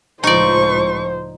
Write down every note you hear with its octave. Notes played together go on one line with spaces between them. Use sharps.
C#2 A2 F3 D#4 C5 D5 C#6